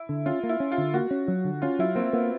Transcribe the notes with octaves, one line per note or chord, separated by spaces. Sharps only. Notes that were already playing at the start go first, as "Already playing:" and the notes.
Already playing: E4
D3
C#4 F4
A#3
E4
C#4
F4
D3
A#3 F#4
C#4
F#3
D3
C#4 F4
F#3 E4
A#3 C4
A#3 B3